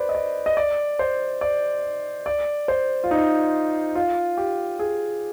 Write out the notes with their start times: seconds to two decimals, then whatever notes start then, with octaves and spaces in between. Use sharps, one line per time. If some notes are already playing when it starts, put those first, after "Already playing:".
Already playing: B4 C5 D5
0.09 D#5
0.15 D5
0.46 D#5
0.57 D5
0.99 C5
1.41 D5
2.26 D5
2.68 C5
3.04 F4
3.11 D#4
3.95 F4
4.37 G4
4.79 G#4